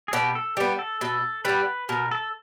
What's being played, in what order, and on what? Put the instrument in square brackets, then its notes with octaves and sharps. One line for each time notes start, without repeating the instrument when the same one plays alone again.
[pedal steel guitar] G#4
[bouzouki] B2 [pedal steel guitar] G4
[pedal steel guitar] A4
[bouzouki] G3 B3 [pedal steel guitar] G4
[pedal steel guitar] A4
[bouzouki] B2 [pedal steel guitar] A4
[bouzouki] G3 B3 [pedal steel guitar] B4
[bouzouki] B2 [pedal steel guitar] A#4
[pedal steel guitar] A4